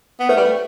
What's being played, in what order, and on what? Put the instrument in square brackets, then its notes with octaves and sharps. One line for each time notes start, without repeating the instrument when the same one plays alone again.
[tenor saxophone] B3
[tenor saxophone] A3 [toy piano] B4
[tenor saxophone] G3
A3